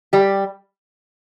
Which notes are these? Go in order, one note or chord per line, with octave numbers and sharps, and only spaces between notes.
G3 G4